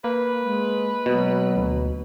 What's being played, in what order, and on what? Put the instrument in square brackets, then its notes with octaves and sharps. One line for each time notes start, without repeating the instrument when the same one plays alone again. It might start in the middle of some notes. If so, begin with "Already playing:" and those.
[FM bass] A#3 [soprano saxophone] B4
[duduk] G#3
[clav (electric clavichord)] B2 [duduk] F#3
[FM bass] D2